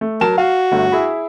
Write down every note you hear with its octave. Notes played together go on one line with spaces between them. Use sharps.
A3
F#3 A#4 A5 E7
F#4 F5
G1 A3
E4 G#4 B5